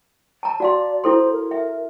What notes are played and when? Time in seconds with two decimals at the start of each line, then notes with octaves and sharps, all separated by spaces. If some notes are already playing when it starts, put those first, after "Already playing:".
0.43 A5 A#5
0.60 F#4 D5 F5 C6
1.04 E4 A4 C5 C6
1.32 A#4
1.51 E5